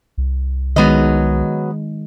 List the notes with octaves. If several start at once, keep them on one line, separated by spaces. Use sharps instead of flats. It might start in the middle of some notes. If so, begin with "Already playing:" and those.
C2
D#3 F#3 G#3 B3 D#5